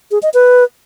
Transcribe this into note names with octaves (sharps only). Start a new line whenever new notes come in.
G#4
D#5
B4